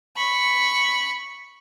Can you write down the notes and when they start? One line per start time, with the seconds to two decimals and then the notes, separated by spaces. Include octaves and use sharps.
0.17 B5 C#6